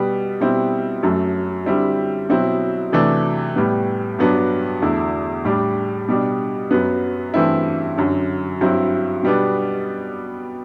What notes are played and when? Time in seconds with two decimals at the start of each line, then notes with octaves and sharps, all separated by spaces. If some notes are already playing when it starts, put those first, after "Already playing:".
Already playing: B2 G3 B3
0.41 B2 G3 C4 E4
1.03 F#2 F#3 A3
1.66 D3 G3 C4 E4
2.29 B2 F#3 C4 E4
2.92 C3 E3 A3 D4
3.56 A2 G3 B3
4.19 G2 F#3 B3 D4
4.82 E2 D3 A3 E4
5.45 A2 G3 D4
6.08 B2 G3 D4
6.71 F#2 F#3 B3
7.34 G2 E3 A3 C4 E4
7.97 F#2 D3 F#3
8.61 G2 F#3 C4 E4
9.23 B2 G3 B3 D4